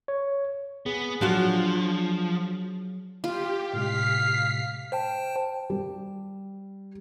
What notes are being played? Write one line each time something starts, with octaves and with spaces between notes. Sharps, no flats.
C#5
B3 G#4
F3 F#3 D4 F4 F#4
F4 G4
A2 C3 G#3 F5 B6 C7
C5 G5 A5
G3